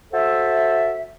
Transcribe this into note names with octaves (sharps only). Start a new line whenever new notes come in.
F#4 A4 C5 E5